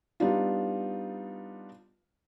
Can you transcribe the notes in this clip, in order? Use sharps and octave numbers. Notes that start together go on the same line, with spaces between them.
G3 B3 D4 D#4 F4